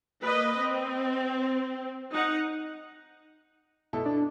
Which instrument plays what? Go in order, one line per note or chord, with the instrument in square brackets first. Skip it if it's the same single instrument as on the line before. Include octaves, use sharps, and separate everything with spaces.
[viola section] A#3 B4 D#5
C4
D#4 F#5
[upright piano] B2 E4 A4
[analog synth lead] D4